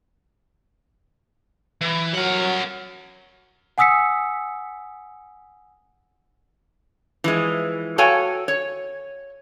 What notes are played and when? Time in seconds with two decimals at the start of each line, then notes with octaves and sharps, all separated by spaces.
1.81 E3
2.14 F#3 A#4 F#5
3.78 F#5 G#5 D#6 E6 B6 C#7
7.24 E3 F3 G#3
7.98 F#4 A4 C#5 F5 G5 G#5
8.48 C#5